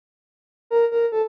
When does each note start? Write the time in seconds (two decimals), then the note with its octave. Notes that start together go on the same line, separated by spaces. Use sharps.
0.71 A#4
0.92 A#4
1.12 A4